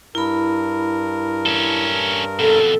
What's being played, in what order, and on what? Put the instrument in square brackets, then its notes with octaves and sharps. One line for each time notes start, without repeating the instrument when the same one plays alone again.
[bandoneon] G2 A#4 [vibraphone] E4 B5
[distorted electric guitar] C#4 A4
[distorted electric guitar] F2 B2 [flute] A4